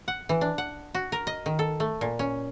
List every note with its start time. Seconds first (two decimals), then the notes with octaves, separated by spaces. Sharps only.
0.08 F#5
0.29 E3
0.41 D4
0.58 F#5
0.94 F#4
1.12 A#4
1.27 D#5
1.46 D#3
1.59 A4
1.80 A3
2.01 A#2
2.19 C#4